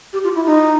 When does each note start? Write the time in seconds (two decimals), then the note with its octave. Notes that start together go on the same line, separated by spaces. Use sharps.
0.13 G4
0.24 F4
0.35 E4
0.46 D#4